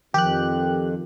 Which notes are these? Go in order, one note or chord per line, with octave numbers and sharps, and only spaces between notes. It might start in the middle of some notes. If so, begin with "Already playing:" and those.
F2 D#3 F3 G4 F#6